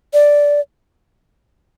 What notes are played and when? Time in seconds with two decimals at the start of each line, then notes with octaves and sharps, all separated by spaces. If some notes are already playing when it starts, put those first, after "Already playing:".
0.14 D5